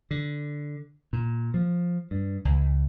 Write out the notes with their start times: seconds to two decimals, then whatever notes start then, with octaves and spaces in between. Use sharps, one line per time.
0.11 D3
1.13 A#2
1.54 F3
2.11 G2
2.45 C#2